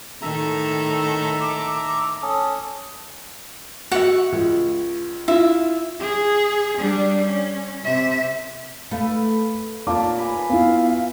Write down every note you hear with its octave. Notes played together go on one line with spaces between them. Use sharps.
A2 D#3 A4 E5 A#5
D6
D6
C#4 A4 D#6
F#4 E5 F#5 C#6
C#2
E4 F4 E5
G#4
G3 D4
C#4
C3 E5
A3 B4 F5
A#2 F5 A5 D6
B4 G#5
B3 E4 F4 F5